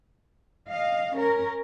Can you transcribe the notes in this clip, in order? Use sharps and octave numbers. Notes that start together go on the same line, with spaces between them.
D#5 F5
C#4 A#4